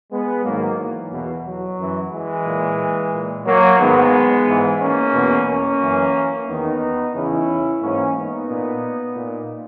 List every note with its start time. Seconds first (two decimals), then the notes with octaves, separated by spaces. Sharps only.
0.12 G#3 B3
0.45 G#2 D#3 F#3 A#3
0.78 E3
1.12 E2 B2
1.46 F#3
1.79 F#2 E3
2.12 E3 G#3
2.46 A#2
3.13 A#2
3.46 F#3 A#3
3.80 G#2 D#3 G#3 B3
4.47 G#2 E3
4.80 A#3 C#4
5.14 E2 B2
5.47 A#3 C#4
5.81 F#2 E3
6.48 E2 D#3 B3 D#4
7.15 E2 C#3 E3 C#4 E4
7.82 G#2 E3 A#3 C#4
8.15 B3 D#4
8.49 A#2
9.16 A#2